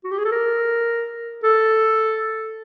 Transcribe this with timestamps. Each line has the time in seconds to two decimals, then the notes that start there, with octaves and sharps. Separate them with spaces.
0.04 F#4
0.11 G4
0.18 G#4
0.25 A4
0.32 A#4
1.43 A4